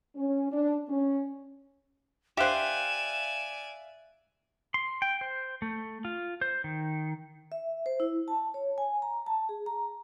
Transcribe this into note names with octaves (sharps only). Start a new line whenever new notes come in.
C#4
D4
C#4
G4 C5 D5 E5 F5 G#5 F#6 E7
C6
G5
C5
A3
F4
C5
D#3
E5
C5
E4
A5
C#5
G#5
A#5
A5
G#4
A#5